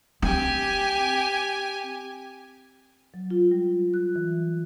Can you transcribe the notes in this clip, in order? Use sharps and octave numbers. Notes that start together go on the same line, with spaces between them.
C4 G4 G#5
F#3
F4
G3
F#6
E3